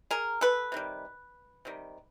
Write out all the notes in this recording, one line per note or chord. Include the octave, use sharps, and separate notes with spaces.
G#4 A#4
A4 B4
C3 D#3 G3
C3 D#3 G3